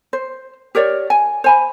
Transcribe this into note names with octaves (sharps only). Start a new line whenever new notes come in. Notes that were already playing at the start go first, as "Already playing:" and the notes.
C5
G4 A#4 C#5 D5
G#5
C5 G#5 B5